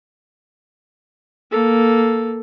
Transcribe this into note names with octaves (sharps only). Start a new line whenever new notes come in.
A#3 A4